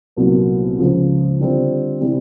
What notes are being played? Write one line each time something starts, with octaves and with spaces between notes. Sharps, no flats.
C2 A#2 F#3 B3
C#2 C#3 F3
D3 G3 C4 F4
C3 E3 G3 C4